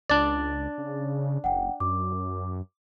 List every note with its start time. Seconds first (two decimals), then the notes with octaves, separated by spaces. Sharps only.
0.10 C#2 D4 D5 A6
0.78 C#3
1.44 F#1 F#5 G5
1.80 F#2 D6